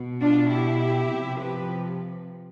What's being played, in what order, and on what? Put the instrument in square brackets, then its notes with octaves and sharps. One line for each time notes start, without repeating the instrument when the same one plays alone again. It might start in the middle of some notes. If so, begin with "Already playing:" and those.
Already playing: [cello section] B2
D4 F4
E4 G4
C3 F3
G4 B4